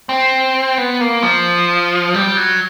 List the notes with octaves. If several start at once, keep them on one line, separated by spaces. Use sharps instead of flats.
C4
B3
A#3
F3
G3
F#3